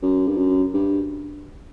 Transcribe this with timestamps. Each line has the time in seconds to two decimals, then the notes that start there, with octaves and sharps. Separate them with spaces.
0.02 F#2
0.28 G2
0.38 F#2
0.74 G2